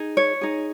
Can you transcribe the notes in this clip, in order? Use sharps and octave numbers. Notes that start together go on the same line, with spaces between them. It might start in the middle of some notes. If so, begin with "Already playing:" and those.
Already playing: D#4 G#4
C#5
D#4 G#4